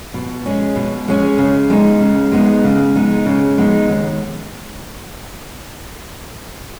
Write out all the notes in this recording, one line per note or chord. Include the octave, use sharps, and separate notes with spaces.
B2
G#3 C#4 G#4
B2
G#3 C#4 G#4
C#3
G#3 B3 D#4
C#3
G#3 B3 D#4
C#3
G#3 B3 D#4
C#3
G#3 B3 D#4
D#2